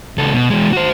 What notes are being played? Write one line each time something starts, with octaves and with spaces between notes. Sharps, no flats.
C#2 A4
B2
E3 G#3
F#4 C5